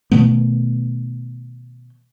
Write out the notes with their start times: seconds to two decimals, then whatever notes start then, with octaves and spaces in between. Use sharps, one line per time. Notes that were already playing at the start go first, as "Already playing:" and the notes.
0.11 B2 D#3 A3 B3